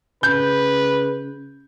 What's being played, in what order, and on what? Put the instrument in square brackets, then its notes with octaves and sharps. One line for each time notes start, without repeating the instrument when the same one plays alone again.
[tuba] C#3 [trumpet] B4 [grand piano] G6